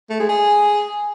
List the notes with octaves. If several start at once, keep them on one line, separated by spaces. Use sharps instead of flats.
A3
G#3
G#4